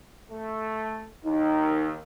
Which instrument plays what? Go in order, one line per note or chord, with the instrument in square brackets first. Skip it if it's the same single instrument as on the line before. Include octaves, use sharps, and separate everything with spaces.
[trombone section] A3
[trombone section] D#2 [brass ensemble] D#4